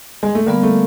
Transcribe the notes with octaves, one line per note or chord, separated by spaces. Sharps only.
G#3
A3
D3 G3 A#3 B3
A3